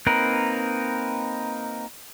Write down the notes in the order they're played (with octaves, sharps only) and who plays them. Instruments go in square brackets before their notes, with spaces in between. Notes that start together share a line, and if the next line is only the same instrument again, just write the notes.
[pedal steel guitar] A#3 C4 D#4 A#4 B4